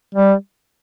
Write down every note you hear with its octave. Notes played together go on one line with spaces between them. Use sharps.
G3